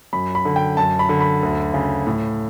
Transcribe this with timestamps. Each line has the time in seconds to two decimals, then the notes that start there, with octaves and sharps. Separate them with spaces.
0.13 F#2 B5
0.35 B5
0.45 D3
0.56 G5
0.77 F#2 A5
0.99 B5
1.09 D3
1.21 B5
1.43 D2
1.74 C#3
2.07 A2